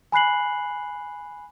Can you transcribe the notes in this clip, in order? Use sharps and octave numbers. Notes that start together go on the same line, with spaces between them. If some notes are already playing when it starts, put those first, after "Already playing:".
G#5 B5 F#6 C7 F#7